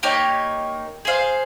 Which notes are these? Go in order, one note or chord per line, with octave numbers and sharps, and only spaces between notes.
A#3 D#4 G4 C#5
G#4 C5 F5